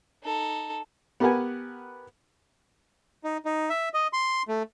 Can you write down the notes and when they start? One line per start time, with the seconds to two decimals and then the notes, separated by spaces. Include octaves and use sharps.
0.23 D#4 A4
1.20 B3 G4 A#4 B4 F#5 G#5
3.24 D#4
3.45 D#4
3.70 E5
3.94 D#5
4.13 C6
4.48 A3